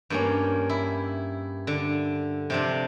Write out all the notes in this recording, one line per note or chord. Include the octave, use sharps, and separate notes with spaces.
G2 A#3 C#4
E4
D3
C3 F3 D4